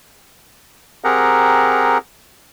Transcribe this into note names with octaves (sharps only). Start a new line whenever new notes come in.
C4 G4 G#4 A#4 F#5 A#5